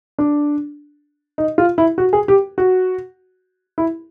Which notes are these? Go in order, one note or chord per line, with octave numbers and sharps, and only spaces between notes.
D4
D#4
F4
E4
F#4
G#4
G4
F#4
E4